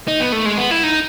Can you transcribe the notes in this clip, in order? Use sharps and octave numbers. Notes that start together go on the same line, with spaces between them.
D#4
B3
A3
G#3
B3
E4
D#4